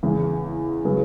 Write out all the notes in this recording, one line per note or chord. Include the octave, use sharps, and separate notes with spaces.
E2 C#3 E3
C#3 F#3 B3